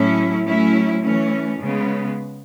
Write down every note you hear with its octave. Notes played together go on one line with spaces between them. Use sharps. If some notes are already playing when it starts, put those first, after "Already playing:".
Already playing: A2 F#3 C#4 E4
F#3 A3 C#4 E4
E3 A3 C#4
C#3 G#3 B3